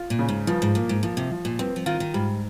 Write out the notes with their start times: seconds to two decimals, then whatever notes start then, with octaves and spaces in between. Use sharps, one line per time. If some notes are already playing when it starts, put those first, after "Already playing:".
Already playing: F4
0.10 A#2
0.19 C#3
0.29 G#2
0.47 G2 F3
0.62 G#2
0.75 A#2 A#3
0.89 G#2
1.03 A#2 F3
1.17 C3
1.31 F3
1.45 A#2
1.59 G2 C4
1.76 F3
1.86 D#3 F4
2.00 D#3
2.14 G#2 G3